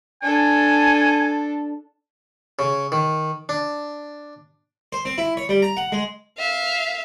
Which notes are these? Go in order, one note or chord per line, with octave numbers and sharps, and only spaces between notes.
D4 A4 G#5
C#3
D#3
D4
C5
C4
E4
C#5
G3
A#5
F#5
G#3
E5 F5